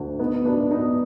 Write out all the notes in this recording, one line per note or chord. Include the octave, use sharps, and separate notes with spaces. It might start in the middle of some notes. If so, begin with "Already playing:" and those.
Already playing: D2
B3 D#4
B3 D4
B3 D#4